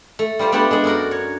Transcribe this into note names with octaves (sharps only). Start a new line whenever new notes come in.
A3
G3 F4 C5 D5
A3 B3 D4 G4 A5
G#3 A3 D4
F#2 F#4 A#4
C#5